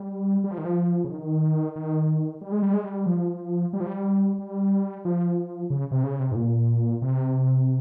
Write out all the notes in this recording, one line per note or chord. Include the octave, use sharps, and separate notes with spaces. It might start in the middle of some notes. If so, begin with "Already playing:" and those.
Already playing: G3
G3
F3
D#3
F3
C#3
D#3
D#3
G3
G#3
G3
G#3
G3
F3
G3
F3
G3
G3
F3
C#3
C3
C#3
C3
G#2
A#2
C3